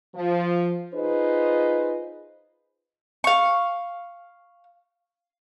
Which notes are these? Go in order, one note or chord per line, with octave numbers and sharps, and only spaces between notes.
F3
D#4 F4 G#4 B4 C5 D#5
F5 C#6